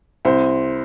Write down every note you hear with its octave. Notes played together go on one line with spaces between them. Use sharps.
C2 C5